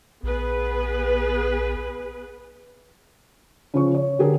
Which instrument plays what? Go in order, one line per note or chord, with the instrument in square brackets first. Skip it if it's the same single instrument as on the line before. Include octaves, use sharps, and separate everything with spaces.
[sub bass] A#1 [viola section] B3 G#4 B4
[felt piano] C#3 F3 C#6
C#5
D3 G4 G#4 A#4